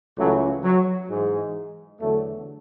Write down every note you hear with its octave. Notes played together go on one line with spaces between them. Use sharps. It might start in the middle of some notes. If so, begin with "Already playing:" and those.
C#2 C#3 E3 F#3 A3
F#3
G#2 E3 G#3
E2 D3 F#3 A3